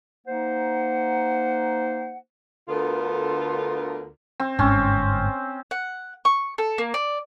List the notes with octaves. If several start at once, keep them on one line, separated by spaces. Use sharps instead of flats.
A#3 D#4 C5 F#5
D2 D3 B3 F4 A4 A#4
C4
G1 G#2 C4 C#4
F#5
C#6
A4
A#3
D5